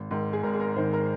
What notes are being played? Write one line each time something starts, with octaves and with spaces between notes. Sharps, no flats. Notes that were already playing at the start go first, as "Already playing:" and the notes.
Already playing: G#1
G#2 D#3
G#4
G#1 A#4
G#4
A#4
G#2 D#3 C5
A#4